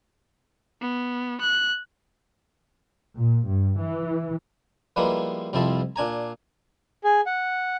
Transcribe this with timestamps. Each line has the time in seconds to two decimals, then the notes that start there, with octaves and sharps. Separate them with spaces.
0.81 B3
1.41 F#6
3.16 A#2
3.47 G2
3.79 E3
4.96 F3 G3 G#3 A#3 B3 E4
5.53 C2 F2 F3 C4 E4 A5
5.96 A#2 D4 G#5 A#5
7.04 G#4
7.26 F#5